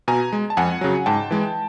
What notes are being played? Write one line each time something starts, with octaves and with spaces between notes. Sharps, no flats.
B2 G#5 A#5
G#3
A5
F2 F#5 G#5
C#3 F#3
G#2 G5 A5
E3 G#3